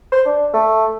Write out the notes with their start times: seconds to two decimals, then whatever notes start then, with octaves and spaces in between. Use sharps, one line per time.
0.12 C5
0.26 D4
0.53 A3